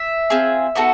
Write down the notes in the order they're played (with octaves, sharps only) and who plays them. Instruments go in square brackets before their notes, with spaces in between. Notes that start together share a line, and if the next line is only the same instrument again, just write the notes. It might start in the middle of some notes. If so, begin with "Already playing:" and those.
Already playing: [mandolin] E5
C4 F4 G#4
B3 D#4 F#4 A4